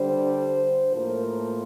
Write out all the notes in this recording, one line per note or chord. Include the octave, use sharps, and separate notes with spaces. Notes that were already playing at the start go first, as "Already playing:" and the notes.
Already playing: D3 G3 D4 C5
A2 F3 A#3 A#4